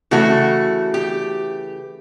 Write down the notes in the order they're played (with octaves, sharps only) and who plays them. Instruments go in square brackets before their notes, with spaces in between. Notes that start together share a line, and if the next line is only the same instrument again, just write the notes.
[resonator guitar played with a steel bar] C#3 E3 A3 F#4
G4